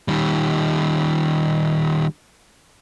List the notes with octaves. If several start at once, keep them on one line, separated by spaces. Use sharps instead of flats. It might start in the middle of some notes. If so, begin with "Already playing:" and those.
D#3 G3